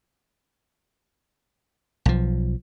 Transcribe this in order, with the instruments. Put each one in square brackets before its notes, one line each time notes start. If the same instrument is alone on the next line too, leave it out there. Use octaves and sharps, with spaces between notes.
[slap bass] B1 F3